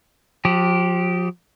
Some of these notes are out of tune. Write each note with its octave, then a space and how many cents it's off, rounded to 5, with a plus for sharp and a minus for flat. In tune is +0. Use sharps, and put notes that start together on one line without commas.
F3 +35 G4 -10